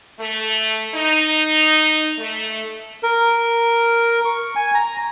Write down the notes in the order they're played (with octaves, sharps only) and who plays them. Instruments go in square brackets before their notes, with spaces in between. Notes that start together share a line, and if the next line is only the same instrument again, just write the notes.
[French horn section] A3
D#4
A3
[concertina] A#4
C#6
G#5
A#5